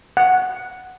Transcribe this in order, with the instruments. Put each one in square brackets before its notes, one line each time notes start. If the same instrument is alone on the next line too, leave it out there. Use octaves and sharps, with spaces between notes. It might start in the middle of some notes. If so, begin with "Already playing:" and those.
[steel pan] F#5